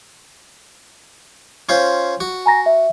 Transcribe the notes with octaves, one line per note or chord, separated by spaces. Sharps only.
C#4 F4 C5
F#4
G#5 A#5 A#6
E5